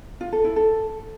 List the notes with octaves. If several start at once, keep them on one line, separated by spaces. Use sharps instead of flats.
F4
A4
E4
A4